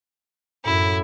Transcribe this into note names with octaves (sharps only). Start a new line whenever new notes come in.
F#2 A2 E4